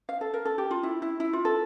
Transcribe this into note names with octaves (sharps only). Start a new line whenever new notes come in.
F5
A4
A#4
A4
G4
F4
E4
E4
E4
F4
A4